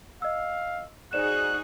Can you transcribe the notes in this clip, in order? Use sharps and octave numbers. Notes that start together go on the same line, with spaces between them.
D#5 F5 E6
D#4 F#4 G#4 C5 D5 F#6 E7